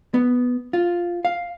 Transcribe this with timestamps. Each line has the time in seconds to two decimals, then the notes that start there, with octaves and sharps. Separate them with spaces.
0.14 B3
0.73 F4
1.25 F5